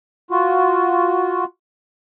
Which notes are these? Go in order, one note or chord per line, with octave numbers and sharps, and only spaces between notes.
F4 F#4